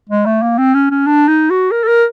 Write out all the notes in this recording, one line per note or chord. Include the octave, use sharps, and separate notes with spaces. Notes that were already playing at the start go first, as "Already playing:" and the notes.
G#3
A3
A#3
C4
C#4
C#4
D4
D#4
F#4
A#4
A4
A#4